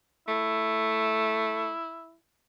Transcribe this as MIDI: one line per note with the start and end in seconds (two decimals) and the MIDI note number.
0.28 1.71 57
0.28 2.15 64